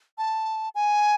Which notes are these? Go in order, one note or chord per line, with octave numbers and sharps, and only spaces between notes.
A5
G#5